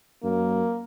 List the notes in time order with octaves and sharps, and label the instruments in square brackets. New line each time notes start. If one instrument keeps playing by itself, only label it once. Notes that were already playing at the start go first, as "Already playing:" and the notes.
[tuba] F#2 [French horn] A#3